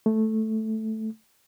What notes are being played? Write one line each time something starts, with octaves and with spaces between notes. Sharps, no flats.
A3